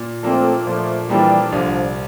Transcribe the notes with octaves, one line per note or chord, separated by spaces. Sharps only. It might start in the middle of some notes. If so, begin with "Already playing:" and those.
Already playing: A#2
F3 A3 A#3 C4 D4 A4
A#2 F3 A3
E3 F3 G3 A#3 D4 A4
C2 D3 F3